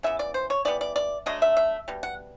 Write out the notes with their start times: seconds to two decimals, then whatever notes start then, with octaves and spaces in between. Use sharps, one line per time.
0.03 C#3 E3 B3 E5
0.19 D5
0.34 C5
0.50 C#5
0.65 E3 G3 B3 D5
0.81 D5
0.96 D5
1.26 D3 F#3 A3 D#5
1.42 E5
1.57 E5
1.88 B2 G3
2.03 F#5